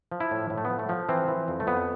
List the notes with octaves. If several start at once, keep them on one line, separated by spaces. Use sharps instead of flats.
F3
E4
A2
A2
A3
B3
F3
A3
F3
E3 C4
E3
F2
A3
F2 B3